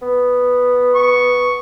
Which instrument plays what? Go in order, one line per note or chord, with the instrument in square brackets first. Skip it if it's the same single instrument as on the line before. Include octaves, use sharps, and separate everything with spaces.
[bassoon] B3
[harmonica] C#6